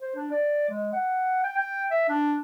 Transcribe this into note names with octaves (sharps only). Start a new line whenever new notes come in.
C5
D4
D5
G#3
F#5
G5
G5
E5
D4